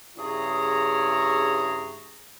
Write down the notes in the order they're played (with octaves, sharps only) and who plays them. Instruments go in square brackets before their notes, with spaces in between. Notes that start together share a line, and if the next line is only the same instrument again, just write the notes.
[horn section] G2 C#3 E4 G#4 C#5 A#5